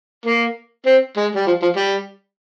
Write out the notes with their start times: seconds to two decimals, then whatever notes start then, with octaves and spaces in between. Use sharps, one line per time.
0.26 A#3
0.86 C4
1.17 G#3
1.35 G3
1.47 F3
1.62 F3
1.76 G3